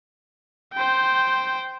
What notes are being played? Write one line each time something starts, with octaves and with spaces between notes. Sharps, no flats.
C5 G5